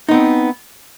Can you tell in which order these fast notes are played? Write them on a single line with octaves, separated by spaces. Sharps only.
D#4 B3 C4